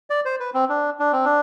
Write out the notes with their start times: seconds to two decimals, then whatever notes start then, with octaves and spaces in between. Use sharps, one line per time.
0.10 D5
0.25 C5
0.40 B4
0.54 C4
0.69 D4
1.00 D4
1.12 C4
1.25 D4